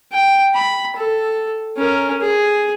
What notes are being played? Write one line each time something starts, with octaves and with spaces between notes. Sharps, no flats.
G5
B5
A4
C#4 A#4
G#4